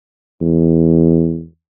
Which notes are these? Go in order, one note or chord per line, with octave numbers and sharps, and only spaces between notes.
E2